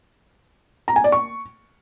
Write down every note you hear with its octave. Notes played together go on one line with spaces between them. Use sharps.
A#5
G#5
D5
C#6